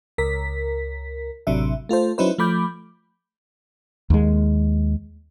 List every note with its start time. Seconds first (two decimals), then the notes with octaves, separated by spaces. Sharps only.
0.18 C#2 A#4 B6
1.47 A1 C3 F#3 D4 E5
1.89 A3 F4 A4 C5
2.18 F#3 C#4 D#4 E4 B4 C5
2.38 F3 A3 B5 D6 G6
4.10 D#2 G#3